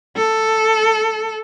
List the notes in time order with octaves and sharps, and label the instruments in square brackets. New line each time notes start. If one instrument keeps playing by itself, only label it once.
[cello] A4